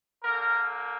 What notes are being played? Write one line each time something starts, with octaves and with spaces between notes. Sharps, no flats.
D3 A#3 A#4